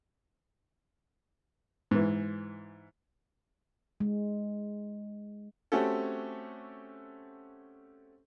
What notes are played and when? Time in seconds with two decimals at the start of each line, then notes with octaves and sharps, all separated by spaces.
1.91 G#2 E3
4.00 G#3
5.72 A3 C4 C#4 F#4 G4 A4